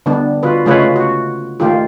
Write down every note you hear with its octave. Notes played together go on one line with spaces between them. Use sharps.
D3 G3 B3 D4
D3 F4 F#4 B4
C#3 G#3 A3 F4 B4 C#5
F#4
D#3 A3 A#3 F4 G4